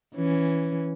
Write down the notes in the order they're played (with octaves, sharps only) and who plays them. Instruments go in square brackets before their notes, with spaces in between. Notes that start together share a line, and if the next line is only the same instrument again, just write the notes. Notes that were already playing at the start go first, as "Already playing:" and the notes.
[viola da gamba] E3 C#4